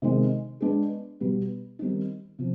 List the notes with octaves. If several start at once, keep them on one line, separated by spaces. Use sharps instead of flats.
C3 D#3 G#3
G#3 B3 D4 G#4
B2 G3 B3
D#3 G3 C4 D#4
C3 F3